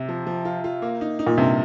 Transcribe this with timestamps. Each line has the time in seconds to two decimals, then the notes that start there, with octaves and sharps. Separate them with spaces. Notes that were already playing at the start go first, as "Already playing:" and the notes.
Already playing: C3
0.09 F3
0.27 F3
0.45 F4
0.64 F4
0.82 A#3
1.01 D#4
1.19 D#4
1.27 A#2
1.38 G2 C3